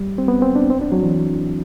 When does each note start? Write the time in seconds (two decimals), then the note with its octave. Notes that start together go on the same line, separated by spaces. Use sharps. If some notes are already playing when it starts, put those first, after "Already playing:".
Already playing: G3
0.18 C4
0.28 B3
0.42 C4
0.55 D4
0.70 C4
0.81 D4
0.92 F#3
1.03 E3